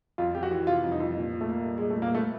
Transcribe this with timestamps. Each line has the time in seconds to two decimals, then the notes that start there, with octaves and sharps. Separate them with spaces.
0.18 F2 F4
0.35 F2 G4
0.43 F#4
0.51 E3
0.67 C3 F4
0.84 F2
0.92 D#4
1.00 F2
1.16 A#2
1.33 A#2
1.41 A3
1.49 A#3
1.66 G3
1.77 G#3
1.82 A#2
1.90 A3
1.98 A#2 A#3
2.15 A3 B3